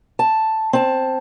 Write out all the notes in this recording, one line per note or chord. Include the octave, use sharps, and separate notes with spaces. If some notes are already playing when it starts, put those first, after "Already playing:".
A5
C4 A5